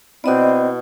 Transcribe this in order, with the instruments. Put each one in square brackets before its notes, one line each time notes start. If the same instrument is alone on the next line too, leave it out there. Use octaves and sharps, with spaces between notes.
[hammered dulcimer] B2 E4 [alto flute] C4 [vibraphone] D5 D#5